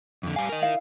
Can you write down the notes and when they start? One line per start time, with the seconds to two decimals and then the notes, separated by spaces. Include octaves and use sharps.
0.23 F2 D3
0.36 G3 F5 G#5
0.49 A#4 D#5
0.62 E4 F5